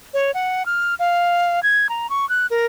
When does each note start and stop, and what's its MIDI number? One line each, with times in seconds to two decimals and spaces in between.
0.14 0.31 73
0.34 0.65 78
0.66 0.94 89
0.99 1.62 77
1.63 1.87 92
1.89 2.10 82
2.10 2.28 85
2.29 2.46 90
2.50 2.66 70